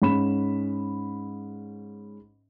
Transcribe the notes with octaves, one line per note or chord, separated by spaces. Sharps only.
G#2 C#4 B5 E7